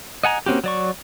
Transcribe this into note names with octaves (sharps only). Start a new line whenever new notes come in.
D#5 F#5 G#5 A#5
A#3 C4 C#4 F#4 G4
F#3 D5 C#6